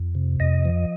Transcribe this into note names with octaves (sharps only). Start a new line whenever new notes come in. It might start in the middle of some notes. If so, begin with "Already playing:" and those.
Already playing: F2
C3
F2 D#5
F3